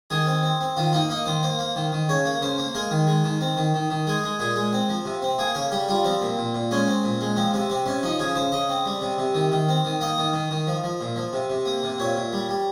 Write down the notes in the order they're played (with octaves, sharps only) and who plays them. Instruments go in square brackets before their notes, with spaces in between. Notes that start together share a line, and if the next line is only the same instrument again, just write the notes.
[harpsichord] D#3 G#4
C4
C4
C4
D#3 F4
A#3 D#4
A#3 D#4
D#3 C5
A#3 C5
A#3
D#3
D#3
C#3 C#5
A#3
C#3 C5
A#3
G#3 A#4
D#3
G#3
D#3
C4
D#3
D#3
D#3
G#3 G#4
G#3
A#2 G#4
G#3
C4
F3
C3
C4
A#3 G#4
C#3 A#4
G3 G4
G3 F4
F3 C4
A#2
A#2
A#2
G#3 C#4
C4
A#2
G#3
F3 C4
C3 C4
C3 C4
C3 C#4
F3 D#4
C#3 G#4
C#3 C5
C#3 D#5
C4
G3
C3
C3
D#3
D#3
C4
D#3
A#3 D#5
D#3
D#3
D#3
F3
F3
A#2
F3
C3
C3
A#3
C3
A#2 C#5
A#2
G3
G3